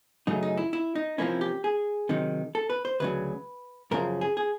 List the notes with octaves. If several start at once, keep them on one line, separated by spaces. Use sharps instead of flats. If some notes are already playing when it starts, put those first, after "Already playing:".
F#2 C#3 F#3 A3 D#4
D#4
E4
E4
D#4
C3 F3 A#3 C#4 E4
G4
G#4
C3 D#3 F#3
A4
B4
C5
D2 C#3 F#3 B4
F#2 C#3 F3 A#4
G#4
G#4